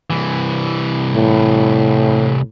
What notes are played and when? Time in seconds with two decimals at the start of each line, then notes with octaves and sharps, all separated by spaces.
0.10 C2 E3
1.15 A2